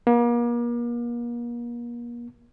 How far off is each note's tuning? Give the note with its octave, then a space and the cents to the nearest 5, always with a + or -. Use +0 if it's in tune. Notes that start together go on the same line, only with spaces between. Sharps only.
A#3 +40